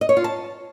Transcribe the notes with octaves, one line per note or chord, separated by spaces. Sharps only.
D#5
C#5
F4
A5